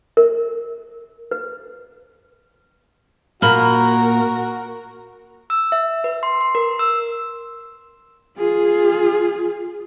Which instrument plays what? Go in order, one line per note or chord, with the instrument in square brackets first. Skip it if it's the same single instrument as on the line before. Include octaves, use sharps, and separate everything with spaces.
[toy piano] A#4
B4
[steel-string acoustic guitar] A#2 [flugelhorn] F#4 [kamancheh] A#4 [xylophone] B5 F6
[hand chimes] E6
E5
B4
C6
C6
A#4
E6
[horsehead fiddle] F4 G#4